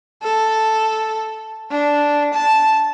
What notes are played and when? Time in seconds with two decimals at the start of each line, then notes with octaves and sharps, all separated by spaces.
0.23 A4
1.71 D4
2.34 A5